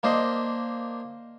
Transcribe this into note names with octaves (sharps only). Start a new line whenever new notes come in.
A#3 D4 C5 D#5